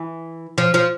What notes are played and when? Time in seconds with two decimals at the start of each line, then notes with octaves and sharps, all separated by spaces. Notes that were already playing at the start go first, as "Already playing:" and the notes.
Already playing: E3
0.58 F3
0.74 F3